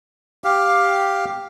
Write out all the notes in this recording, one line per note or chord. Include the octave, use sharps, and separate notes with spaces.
G4 F5